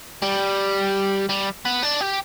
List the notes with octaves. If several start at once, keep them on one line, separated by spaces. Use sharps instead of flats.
G3
G3
B3
D4
G4